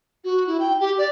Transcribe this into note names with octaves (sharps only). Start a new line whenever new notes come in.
F#4
E4
G5
G4
D5